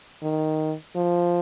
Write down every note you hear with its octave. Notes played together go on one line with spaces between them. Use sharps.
D#3
F3